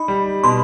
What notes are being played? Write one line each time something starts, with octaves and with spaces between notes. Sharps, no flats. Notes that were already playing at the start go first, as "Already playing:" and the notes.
Already playing: D#4 B5
G3
B2 C6